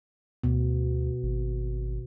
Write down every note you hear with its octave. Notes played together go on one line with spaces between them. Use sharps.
D2 B2
G#1